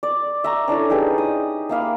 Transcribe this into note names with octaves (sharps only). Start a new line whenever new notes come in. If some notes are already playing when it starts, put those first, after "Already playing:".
D5
E5 A#5 C#6
C#4 D4 E4 A4
D#4 G4 G#4 B4
D#6
A#3 E5 F5 B5